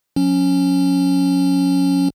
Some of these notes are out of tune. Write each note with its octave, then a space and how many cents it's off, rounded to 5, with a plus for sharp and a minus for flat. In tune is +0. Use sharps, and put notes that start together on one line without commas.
F#3 -45 C#4 +0